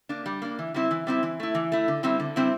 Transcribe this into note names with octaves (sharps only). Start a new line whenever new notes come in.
A#3 D4
G3
A#3 D4
E3
G3 C4 E4
E3
G3 C4 E4
E3
A3 E4
E3
A3 E4
D3
G3 C4 E4
D3
G3 C4 E4